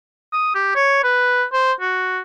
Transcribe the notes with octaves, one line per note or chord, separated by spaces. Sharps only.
D#6
G4
C#5
B4
C5
F#4